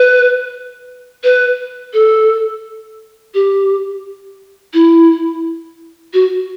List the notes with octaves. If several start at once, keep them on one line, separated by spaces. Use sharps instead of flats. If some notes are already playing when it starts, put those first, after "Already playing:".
Already playing: B4
B4
A4
G4
E4
F#4